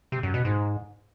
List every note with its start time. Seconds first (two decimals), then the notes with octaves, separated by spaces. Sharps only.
0.12 C3
0.23 F#2
0.34 B2
0.45 G#2